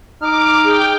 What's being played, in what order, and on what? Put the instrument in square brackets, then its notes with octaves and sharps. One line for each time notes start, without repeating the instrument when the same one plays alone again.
[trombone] D#4 [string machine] D6 [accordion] F6
[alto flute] G#4 [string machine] G5